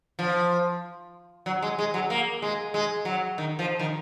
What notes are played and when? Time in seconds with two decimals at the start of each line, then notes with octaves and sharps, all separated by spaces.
0.19 F3
1.46 F#3
1.62 G#3
1.79 G#3
1.94 F#3
2.10 A#3
2.42 G#3
2.74 G#3
3.05 F#3
3.38 D#3
3.59 F3
3.79 D#3